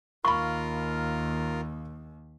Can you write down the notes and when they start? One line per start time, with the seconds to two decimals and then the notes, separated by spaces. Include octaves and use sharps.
0.25 D#2 F4 A#4 F5 B5 C#6